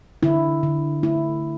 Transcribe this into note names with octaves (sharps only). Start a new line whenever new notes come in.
D3 E4
D3
A3 E4